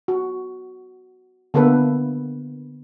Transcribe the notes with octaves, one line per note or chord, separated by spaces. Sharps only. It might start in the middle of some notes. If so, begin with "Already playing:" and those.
F#4
D3 A#3 B3 A4 B4